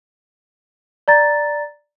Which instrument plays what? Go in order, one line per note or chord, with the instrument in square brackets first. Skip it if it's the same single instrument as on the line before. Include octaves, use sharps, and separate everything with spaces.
[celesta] D5 A#5 A6